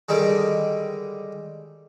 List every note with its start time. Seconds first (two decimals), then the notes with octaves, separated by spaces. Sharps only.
0.09 D3 D#3 G3 G#3